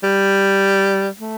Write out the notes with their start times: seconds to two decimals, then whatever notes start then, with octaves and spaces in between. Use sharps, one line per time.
0.03 G3
1.19 A3